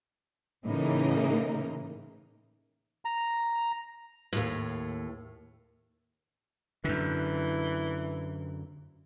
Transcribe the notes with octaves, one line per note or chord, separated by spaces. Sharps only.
A2 C#3 E3 A#3 D#4
A#5
D#2 A2
F#2 D3 E3